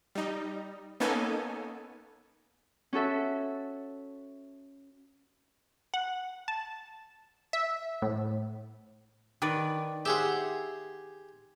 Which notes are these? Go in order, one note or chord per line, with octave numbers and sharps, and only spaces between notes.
G3 D#4
A#3 B3 C#4 D#4 A4 G#5
C#4 F#4 A4 E5
F#5
A5
E5
A2
D#3 B4 D5
G4 G#4 C5 E5 F#5